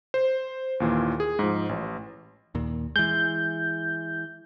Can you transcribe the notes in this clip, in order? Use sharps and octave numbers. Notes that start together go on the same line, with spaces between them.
C5
D#2 A#2 E3
G#4
G#2 F3
A1
D#2 A#2
E3 G#3 G6